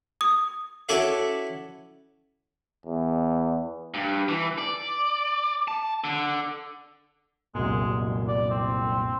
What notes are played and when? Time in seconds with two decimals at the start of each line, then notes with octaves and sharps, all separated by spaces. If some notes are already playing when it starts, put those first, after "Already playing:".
0.21 D#6
0.89 C#4 E4 F#4 A4 D5 E5
2.86 E2
3.94 G2
4.28 E3
4.58 D5
5.68 A5
6.04 D3
7.55 C2 F#2 A#2 G#3
8.28 D5
8.51 C4